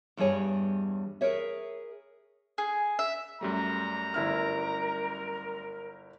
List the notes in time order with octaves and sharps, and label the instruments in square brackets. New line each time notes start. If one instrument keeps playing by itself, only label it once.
[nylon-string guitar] E2 G2 G3 G#4 C#5
G#4 A#4 B4 C#5 E5
[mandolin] G#4
E5
[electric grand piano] F#2 G3 A3 [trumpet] A#5
[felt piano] G1 E4 F6 [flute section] A#4